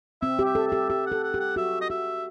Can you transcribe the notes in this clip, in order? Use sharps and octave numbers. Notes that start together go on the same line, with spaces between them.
C4 E5
G4
E5
A4
G4 E5
G4 E5
F#5
A4
F#5
G4
F#5
F#4 E5
D#5
F#4 E5